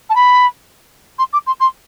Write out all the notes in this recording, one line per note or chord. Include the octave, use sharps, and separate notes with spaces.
A5
B5
C6
D6
C6
C6